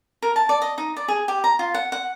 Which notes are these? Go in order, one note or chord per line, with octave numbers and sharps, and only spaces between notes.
A#4
A5
D5
D#5
D#4
D5
G#4
G4
A#5
F4
F#5
F#5